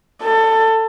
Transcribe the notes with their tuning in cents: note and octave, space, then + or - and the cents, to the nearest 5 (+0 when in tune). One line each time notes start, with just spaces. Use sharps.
A4 +20